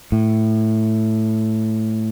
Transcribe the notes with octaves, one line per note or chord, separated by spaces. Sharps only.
A2